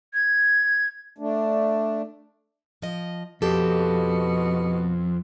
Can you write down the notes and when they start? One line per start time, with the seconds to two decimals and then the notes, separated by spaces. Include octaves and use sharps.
0.13 G#6
1.18 A3 D4
2.82 F3 D#5
3.42 F2 B2 G4 A4